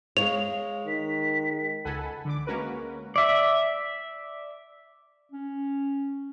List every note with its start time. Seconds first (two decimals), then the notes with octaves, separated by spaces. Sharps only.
0.17 G#3 C#5 F5 F7
0.87 D#3 B6
1.85 C#2 A4 F#5 G#5 B5
2.25 D3 D6
2.46 G#3 A#3 C#4 F#4 A#4 B4
3.16 D5 E5
5.32 C#4